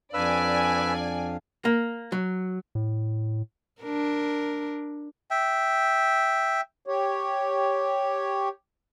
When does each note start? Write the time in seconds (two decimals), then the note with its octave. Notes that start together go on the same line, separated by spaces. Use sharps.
0.14 F2 D4 B4 D5 F5 G#5 E6
1.65 A#3
2.12 F#3
2.75 A2
3.82 D4 A#4
5.31 E5 G5
6.87 G4 C#5